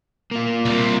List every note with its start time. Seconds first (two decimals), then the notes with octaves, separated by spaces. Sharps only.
0.31 A#3 F4
0.65 C2 C3